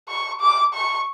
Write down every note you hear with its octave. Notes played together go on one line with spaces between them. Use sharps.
C#6
D6
C#6